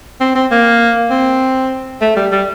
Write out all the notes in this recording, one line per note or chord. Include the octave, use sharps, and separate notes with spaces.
C4
C4
A#3
C4
A3
G3
G3